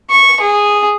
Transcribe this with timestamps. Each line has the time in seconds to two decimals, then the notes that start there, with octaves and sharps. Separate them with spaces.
0.10 C#6
0.41 G#4